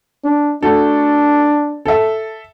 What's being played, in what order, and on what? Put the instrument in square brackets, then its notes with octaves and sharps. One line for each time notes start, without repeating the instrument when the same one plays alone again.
[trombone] D4
[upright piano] A3 F#4 A4 [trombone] D4
[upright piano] A4 E5